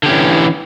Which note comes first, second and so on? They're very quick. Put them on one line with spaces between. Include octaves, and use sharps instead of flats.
D3 G4 C#4 E3